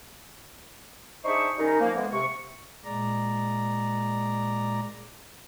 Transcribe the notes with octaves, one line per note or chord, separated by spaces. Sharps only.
D4 D#4 G#4 C5 E5 C#6
D#3 G3 C#4 D#4
F3 A#3
D3 E3 G#3 B3
C3 C#6
A#2 G#3 D5 A#5